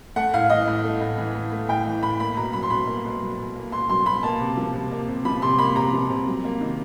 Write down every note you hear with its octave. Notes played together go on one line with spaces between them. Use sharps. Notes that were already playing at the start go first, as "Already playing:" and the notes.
A3 F#5
A2 F5
E3 D#5
A2
A3
A2
E3
A2
A3
A2 G5
E3
A2 B5
A#3 B5
B2 A#5
F#3 B5
C6
B2 B5
A#3
B2
F#3
B2
A#3
B2 C6
F#3 C6
B2 B5
A#3 A5
C3
F3
C3
A#3
C3
F3 B5
C3 C6
A#3 B5
C3 A#5
F3
C3
F#3
A#3
D#3